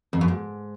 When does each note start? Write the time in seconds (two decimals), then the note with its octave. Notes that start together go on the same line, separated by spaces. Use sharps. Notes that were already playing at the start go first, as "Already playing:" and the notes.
0.13 F2
0.21 F#2
0.28 G#2